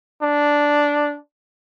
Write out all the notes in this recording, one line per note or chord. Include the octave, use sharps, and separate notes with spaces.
D4